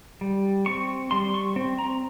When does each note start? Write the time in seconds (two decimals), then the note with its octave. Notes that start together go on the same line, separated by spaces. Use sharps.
0.21 G3
0.66 C4 C#6
1.11 G3 C6
1.34 C#6
1.56 C4
1.79 A#5